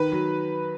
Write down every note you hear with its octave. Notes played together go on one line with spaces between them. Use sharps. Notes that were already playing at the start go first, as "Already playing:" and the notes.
Already playing: D#3 B4
F#3